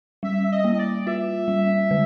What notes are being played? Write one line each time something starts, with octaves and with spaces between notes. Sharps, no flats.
G3 E5
E5
D#5
A#3
D#5
D5
F4 E5
G3
D3